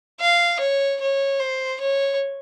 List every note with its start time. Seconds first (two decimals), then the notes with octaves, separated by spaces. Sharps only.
0.20 F5
0.60 C#5
1.01 C#5
1.40 C5
1.80 C#5